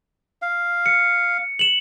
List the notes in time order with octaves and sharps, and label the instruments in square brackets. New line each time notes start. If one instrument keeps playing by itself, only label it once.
[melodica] F5
[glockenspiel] C#7
E7 F#7